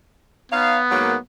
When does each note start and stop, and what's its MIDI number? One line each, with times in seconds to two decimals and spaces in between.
0.52 1.19 59
0.52 0.78 63
0.52 0.78 73
0.52 0.78 77
0.91 1.15 44
0.91 1.15 54
0.91 1.15 58